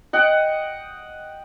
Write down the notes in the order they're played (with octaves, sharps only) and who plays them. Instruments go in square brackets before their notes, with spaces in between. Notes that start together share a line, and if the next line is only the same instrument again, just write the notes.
[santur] D#5 F#5 G5